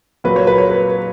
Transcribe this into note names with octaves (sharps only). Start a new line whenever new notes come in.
A#2 F#3 B4
C#5
B4
C#5
B4